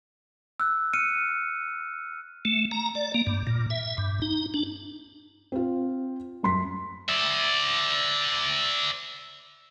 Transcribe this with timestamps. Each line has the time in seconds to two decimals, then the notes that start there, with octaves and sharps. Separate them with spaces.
0.60 E6 F#6
0.93 F6 C#7 D#7
2.45 A3
2.71 A#5
2.95 D5
3.14 A#3
3.27 G2
3.47 A#2
3.70 E5
3.98 G2
4.22 D#4
4.54 D4
5.52 C4 F4
6.43 F#2 C6 B6
7.09 D5 E5